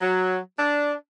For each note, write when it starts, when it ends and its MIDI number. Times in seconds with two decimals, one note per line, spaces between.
0.01 0.37 54
0.58 0.92 62